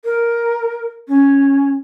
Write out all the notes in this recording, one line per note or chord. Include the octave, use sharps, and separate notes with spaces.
A#4
C#4